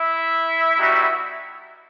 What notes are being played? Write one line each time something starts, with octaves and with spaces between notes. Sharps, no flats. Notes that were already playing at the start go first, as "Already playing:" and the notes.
Already playing: E4 E5
G3 B3 D#4 F#4